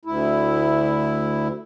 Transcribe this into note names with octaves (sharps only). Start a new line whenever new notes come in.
D2 E4